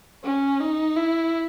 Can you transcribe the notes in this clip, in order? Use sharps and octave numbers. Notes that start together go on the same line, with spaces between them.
C#4
D#4
E4